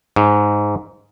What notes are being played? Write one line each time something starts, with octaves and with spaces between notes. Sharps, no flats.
G#2